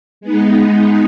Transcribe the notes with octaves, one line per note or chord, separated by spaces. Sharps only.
G#3 B3 D#4